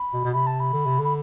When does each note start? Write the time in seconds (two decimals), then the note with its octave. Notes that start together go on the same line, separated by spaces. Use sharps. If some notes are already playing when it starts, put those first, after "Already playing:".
Already playing: B5
0.13 B2
0.24 B2
0.33 C3 B5
0.47 A5
0.60 B5
0.73 D3
0.86 C3
0.99 D3
1.04 B5